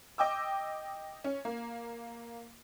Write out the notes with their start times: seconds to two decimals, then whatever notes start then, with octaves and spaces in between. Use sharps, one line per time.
0.18 D#5 G5 D6 E6
1.24 C#4
1.45 A#3